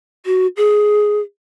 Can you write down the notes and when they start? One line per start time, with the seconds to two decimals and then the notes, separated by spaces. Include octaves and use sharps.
0.26 F#4
0.57 G#4